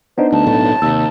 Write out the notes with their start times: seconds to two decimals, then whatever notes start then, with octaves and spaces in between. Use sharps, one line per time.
0.18 B3 D4 D#4 C5
0.32 D2 A5
0.46 B1 A2 A3
0.82 D#2 C3 E6